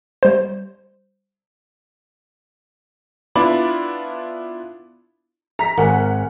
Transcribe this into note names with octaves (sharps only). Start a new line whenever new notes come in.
G3 C5
B3 D4 E4 F4 D5 B5
A#5 B6
G#1 A#4 F#5 G#5